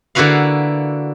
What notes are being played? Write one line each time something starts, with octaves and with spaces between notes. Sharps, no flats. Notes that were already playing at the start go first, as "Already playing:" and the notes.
D3 A#3 E4 F#4 B4 F5